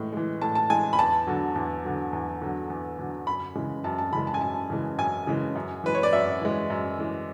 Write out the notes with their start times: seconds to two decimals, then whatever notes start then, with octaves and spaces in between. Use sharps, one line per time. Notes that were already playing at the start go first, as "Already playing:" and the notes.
Already playing: A2 E3 G#3
0.13 E3 G#3
0.42 A2 A5
0.55 A5
0.70 E3 G#3 G#5
0.93 B5
0.98 E2 A5
1.27 D3 F#3
1.56 E2
1.84 D3 F#3
2.13 E2
2.42 D3 F#3
2.70 E2
2.99 D3 F#3
3.27 F#2 B5
3.55 C#3 E3 G#3
3.84 F#2 A5
3.98 A5
4.12 C#3 E3 G#3 B5
4.27 A5
4.34 G#5
4.41 F#2 A5
4.70 C#3 E3 G#3
4.98 F#2 G#5
5.27 C#3 E3 G#3
5.55 F#2
5.84 E3 G#3 B4
5.95 C#5
6.03 D5
6.13 F#2 E5
6.41 E3 G#3
6.70 F#2
6.98 E3 G#3